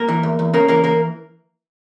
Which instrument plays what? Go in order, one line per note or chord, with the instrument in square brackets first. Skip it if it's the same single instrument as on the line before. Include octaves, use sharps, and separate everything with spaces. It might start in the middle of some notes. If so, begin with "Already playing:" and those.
Already playing: [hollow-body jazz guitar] A#3 A#4
E3
E2
E2
C#3 A#3 A#4
E3 A#3 A#4
A#3 A#4